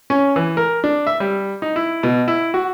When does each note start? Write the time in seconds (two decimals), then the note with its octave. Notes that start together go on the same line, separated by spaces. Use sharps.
0.10 C#4
0.36 E3
0.57 A#4
0.84 D4
1.07 E5
1.20 G3
1.62 D#4
1.76 E4
2.03 B2
2.28 E4
2.54 F#4